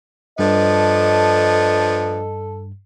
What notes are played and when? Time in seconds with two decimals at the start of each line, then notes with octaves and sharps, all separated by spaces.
0.39 G2 F3 B3 D4 A4 D#5